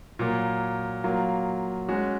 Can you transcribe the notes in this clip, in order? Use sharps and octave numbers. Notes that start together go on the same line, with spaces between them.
A#2 F#3 A#3
F#3 A#3 F4
G#3 C#4 F#4